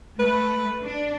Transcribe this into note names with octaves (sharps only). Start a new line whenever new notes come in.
A3 B4
D4